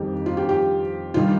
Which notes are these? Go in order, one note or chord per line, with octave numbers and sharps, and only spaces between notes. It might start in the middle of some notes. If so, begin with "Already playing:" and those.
Already playing: F2 D#3 G3 G4
F4
G4
G4
D#3 G3 F4